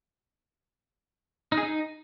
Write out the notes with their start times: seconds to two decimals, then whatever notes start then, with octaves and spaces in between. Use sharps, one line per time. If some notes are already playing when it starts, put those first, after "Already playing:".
1.52 D#4
1.58 G#4
1.63 D#4